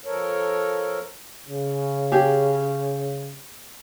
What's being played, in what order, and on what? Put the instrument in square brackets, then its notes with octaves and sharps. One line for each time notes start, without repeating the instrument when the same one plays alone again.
[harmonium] F3 A4 A#4 C#5
[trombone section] C#3
[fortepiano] G4 G#4